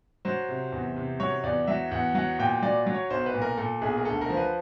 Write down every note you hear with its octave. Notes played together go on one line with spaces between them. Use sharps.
F#3 C5
C3
E2
C3
F#3 C#5
E2 D5
F#3 E5
E2 F#5
F#3 F#5
A#2 G5
F#3 D5
F#3
C#5
B1 C5
B4
A#2
A#4
A#2 A4
B1 G#4
A#4
D2 A4
A#4
F3
B4